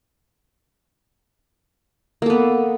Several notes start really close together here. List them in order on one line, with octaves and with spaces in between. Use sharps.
A#3 A4 B3